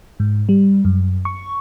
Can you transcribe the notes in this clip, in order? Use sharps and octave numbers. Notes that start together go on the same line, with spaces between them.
G#2
G3
F#2
C#6